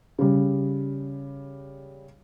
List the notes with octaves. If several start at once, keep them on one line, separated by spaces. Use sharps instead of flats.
C#3 G3